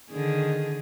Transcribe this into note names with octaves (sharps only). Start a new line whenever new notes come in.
D3 D#3 G#4